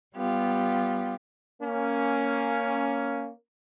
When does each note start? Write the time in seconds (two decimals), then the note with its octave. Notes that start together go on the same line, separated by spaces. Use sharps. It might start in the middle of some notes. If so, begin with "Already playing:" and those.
0.15 G3 B3 F4 G4
1.62 A#3 C#4